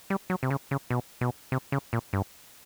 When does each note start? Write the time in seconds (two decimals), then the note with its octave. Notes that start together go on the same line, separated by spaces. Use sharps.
0.10 G3
0.30 F#3
0.43 C3
0.50 C#3
0.71 C#3
0.90 B2
1.21 B2
1.52 C3
1.72 C#3
1.93 A#2
2.13 G2